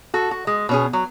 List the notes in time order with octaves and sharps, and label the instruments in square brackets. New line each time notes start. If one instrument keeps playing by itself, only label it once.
[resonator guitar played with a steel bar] F#4 A4
F#4
G#3
B2 C#4 G#4
F#3